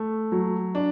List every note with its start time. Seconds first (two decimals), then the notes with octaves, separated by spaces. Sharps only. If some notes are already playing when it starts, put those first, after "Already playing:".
Already playing: A3
0.32 F#3
0.75 D4